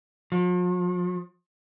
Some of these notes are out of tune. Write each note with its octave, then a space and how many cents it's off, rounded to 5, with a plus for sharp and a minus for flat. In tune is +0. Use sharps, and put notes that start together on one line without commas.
F3 +45